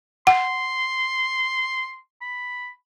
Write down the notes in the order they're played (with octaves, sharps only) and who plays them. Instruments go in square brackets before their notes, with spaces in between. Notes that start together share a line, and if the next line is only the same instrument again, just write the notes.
[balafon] F#5 [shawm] C6
[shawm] B5